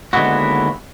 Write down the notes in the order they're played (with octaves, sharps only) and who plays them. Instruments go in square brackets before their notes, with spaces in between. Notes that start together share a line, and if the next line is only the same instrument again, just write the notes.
[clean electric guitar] D#2 D3 G#3 B3 E4 F#4